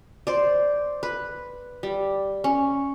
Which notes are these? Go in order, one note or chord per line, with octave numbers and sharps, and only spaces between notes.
C5 D5
B4
G3
C#4